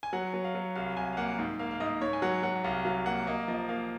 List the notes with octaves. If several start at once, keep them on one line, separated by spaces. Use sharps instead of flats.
G#5
F#3 F#5
F#3
F5
F#3
C2 F5
C2 G#5
F5
A#3 F#5
G#2
A#3 F5
F5
G#2 D#5
G#2 C#5
G#5
F#3 F#5
F#3 F#5
F#5
C2 F5
F#3 F5
A#3 F#5
A#3 D#5
F3 D#5
A#3 F5